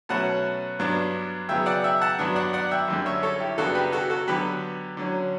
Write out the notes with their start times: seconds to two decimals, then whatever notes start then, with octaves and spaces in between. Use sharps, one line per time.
0.09 B2 F#3 A3 C#4 F#5 A5
0.80 G2 F#3 B3 D4
1.49 C#3 F#3 B3 E5 G5
1.66 D5 F#5
1.84 E5 G5
2.01 F#5 A5
2.19 G2 F#3 B3 D4
2.36 D5 F#5
2.53 D5 F#5
2.71 E5 G5
2.88 F#2 D3 G3
3.06 C#5 E5
3.23 A4 C#5
3.40 E4 G4
3.58 F#2 C#3 F#3 B3 D4 F#4 A4
3.75 G4 B4
3.92 F#4 A4
4.10 F#4 A4
4.27 D3 F#3 B3 G4 B4
4.97 D3 F#3 C#4